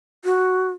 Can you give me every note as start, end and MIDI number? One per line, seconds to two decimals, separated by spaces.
0.25 0.69 66